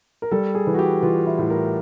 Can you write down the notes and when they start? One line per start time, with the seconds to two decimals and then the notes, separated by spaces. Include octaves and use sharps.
0.22 A#4
0.31 G3 A4
0.55 G#4
0.67 E3
0.74 F#4
0.79 G4
1.03 E3 F4
1.26 E4
1.38 A2
1.50 A#4